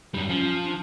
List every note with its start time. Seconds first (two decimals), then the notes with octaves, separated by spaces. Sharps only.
0.14 F#2 G3
0.29 F3 C#4
0.64 D4